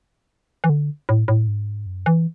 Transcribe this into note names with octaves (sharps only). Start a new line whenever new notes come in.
E3
D3
A2
A2
G#2
F#2
E3